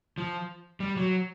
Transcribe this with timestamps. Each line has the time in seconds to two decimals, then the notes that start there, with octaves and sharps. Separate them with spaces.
0.18 F3
0.80 G3
0.97 F#3